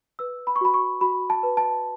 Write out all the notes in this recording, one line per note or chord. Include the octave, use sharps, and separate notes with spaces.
B4 E6
B5
C#6
F#4 B5
C#6
F#4 B5
A5
B4
A5